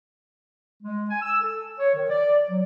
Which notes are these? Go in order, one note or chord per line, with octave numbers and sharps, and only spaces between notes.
G#3
G#5
E6
A4
C#5
D#3
D5
F#3